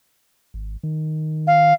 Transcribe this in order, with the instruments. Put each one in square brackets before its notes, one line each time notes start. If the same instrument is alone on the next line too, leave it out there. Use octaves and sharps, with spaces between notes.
[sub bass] G#1
D#3
[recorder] F5